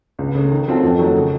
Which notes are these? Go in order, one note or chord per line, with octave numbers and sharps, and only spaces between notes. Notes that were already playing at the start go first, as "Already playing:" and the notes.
C#2
C#3 A3
D#3
F#3 C4 F4 A4
F2
D#3 F#3 A3
C#3